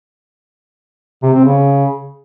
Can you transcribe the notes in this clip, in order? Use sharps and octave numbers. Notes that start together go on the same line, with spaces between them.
C3
C4
C#3